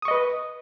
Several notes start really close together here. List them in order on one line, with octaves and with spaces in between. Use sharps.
D#6 C#6 D#5 B4